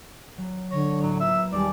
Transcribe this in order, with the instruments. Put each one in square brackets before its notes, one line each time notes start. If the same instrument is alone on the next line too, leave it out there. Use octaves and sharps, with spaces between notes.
[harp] F#3
[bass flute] D3 [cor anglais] C#5 [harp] A#6
[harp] A2 [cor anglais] F#3
[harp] A#3 B3 F4 [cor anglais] E5
[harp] D#2 G#3 A5 [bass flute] G3 [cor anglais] D5